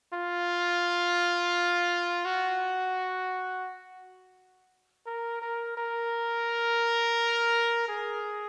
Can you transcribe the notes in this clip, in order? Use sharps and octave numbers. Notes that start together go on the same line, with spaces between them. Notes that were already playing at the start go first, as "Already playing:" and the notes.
F4
F#4
A#4
A#4
A#4
G#4